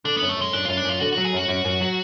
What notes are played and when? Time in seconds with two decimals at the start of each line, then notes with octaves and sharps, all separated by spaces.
0.05 D3 D4
0.17 F#2 B3
0.29 A3
0.37 F#2 G#3
0.53 F#2 D4
0.65 F#2 F4
0.77 D4
0.84 F#2
0.89 F4
1.00 D3 F#4
1.12 F#3 F#4
1.25 G#4
1.33 F#2 F#4
1.48 F#2
1.65 F#2
1.81 F#3